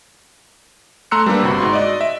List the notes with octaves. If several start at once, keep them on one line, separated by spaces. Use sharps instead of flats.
A3 A#5 C6 E6 F#6 C#7
G3 A#3 D4 G4 B4
G1 C3 F#4 B5
G#2 F#4 C6
D5 D#5
E5